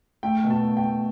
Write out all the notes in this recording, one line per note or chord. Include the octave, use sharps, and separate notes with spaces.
A3 G5
B2
A5
A3
G5
A3